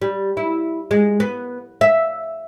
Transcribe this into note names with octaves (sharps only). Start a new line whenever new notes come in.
G3
E4
G#3
B3
E5